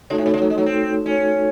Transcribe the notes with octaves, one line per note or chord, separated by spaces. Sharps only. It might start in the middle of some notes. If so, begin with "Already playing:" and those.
C#3 A3 D#4 F#4 A4 C#5
A2
C3
C#3
F#3
G#3
F#3
C4
C#4